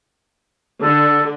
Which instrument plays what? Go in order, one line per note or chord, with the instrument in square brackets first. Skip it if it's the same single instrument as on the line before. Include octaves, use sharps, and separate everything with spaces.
[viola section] D3 [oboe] A4